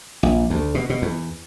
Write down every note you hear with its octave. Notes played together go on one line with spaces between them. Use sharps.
A#1
D2
B2
B2
E2